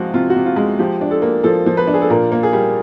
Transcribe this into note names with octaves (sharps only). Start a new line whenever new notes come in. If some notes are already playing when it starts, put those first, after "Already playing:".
Already playing: C3 F3 G#3 F4 F#4
C3 F4
F#4
C3
F4
G#3
F3 G4
D4
A4
A#3
F3 A4
F3
B4
D4
G#4
A4
A#2 A#4
A#3
G#4
G3